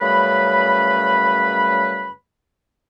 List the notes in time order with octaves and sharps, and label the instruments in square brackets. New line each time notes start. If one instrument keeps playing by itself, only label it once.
[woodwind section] F#2 C#3 G3 A3 B4 B5